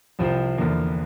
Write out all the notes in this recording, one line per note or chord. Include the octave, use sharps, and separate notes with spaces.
C2 C3 F3 C4 F4
E2 D3 F3 A#3